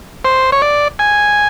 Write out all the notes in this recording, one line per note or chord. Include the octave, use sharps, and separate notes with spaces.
C5
C#5
D5
G#5